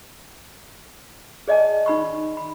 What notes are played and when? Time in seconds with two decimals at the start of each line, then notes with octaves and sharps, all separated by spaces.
1.48 G#4 D5 D#5 G#5 A5
1.86 D#4 B5 C#6
2.37 B5